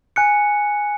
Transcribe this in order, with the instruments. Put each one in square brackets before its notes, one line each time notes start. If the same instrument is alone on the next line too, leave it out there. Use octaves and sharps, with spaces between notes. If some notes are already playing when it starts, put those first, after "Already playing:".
[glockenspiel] G#5 F#6 C#7